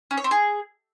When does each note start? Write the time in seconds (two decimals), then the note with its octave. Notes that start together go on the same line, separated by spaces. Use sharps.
0.11 C#4
0.18 C#5
0.24 C4
0.31 G#4